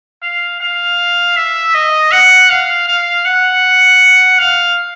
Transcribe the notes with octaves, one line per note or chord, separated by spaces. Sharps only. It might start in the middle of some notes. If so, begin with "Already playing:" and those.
F5
F5
E5
D#5
F#5
F5
F5
F#5
F5